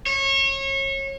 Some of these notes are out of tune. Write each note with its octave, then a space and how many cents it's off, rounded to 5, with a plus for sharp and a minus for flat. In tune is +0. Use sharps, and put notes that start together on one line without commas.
C#5 -30